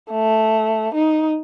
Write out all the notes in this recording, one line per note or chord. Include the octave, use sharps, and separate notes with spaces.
A3
D#4